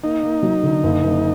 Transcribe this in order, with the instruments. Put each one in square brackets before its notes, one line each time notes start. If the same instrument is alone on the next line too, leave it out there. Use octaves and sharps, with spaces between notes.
[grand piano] A#3 [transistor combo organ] D#4
[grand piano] A#3
F#3
D3
F#1
F#1